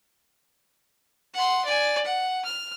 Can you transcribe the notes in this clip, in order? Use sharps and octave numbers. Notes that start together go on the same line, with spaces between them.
F#5 C6
D5 G#5
F#5
F6